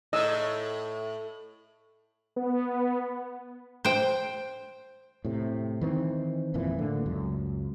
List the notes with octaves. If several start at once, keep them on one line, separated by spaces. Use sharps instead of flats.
A2 D#5 E6
B3
C5 G5
A2 C3
D#3 E3 B3 C4
G#1 F2 A#2 E3
A2 D3 A#3
C#2 F#2